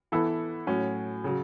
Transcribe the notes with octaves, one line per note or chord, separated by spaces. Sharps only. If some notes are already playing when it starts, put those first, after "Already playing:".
E3 B3 E4 A4
A2 F#3 C#4
C#3 F#3